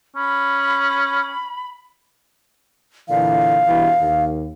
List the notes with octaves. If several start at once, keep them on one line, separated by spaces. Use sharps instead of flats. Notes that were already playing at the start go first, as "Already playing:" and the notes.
C#4 B5
A#2 D3 E3 F5
G2 B2 E3
D#2